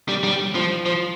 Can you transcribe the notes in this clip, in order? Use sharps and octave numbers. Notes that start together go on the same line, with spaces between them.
G3
G3
F3
F3